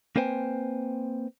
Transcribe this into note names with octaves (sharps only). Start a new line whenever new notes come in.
A#3 C4 B4 C5 G5 G#5